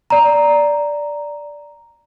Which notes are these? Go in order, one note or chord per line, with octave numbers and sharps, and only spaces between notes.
D5 A#5